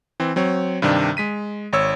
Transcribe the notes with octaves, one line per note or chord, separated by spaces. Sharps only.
E3 C4
F#3 C4 C#5
G2 C3 D#3 D4
G#3 B6 D#7
G#1 C#5 E6